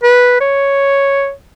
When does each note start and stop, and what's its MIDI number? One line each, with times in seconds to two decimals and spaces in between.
0.03 0.36 71
0.41 1.31 73